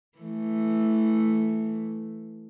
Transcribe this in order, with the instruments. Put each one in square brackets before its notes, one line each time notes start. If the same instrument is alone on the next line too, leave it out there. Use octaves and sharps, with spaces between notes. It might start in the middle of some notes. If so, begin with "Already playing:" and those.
[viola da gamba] E3 A3